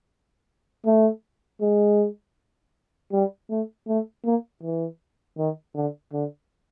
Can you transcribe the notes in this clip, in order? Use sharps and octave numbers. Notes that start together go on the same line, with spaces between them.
A3
G#3
G3
A3
A3
A#3
E3
D#3
D3
D3